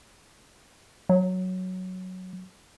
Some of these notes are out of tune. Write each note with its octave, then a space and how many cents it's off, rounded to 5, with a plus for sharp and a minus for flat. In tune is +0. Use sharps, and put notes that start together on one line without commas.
F#3 +0